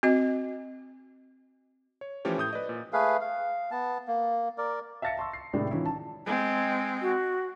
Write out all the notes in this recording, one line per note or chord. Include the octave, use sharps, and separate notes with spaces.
C4 F#4 D#5
C#5
E3 F3 A3 C#4 G4 C#5
A2 D#6 G6
B4 D5 D#5
A#2
A3 G#4 B4 F5
F5
B3 A5
A#3
A#4 D5
E5 F5 A5 A6 A#6 C#7
A5 C6 C#6 E6
C7
A2 C3 D#3 G#3 D4 E4
E3 F3 C#4 D#4 E4
A5
G#3 C4
F#4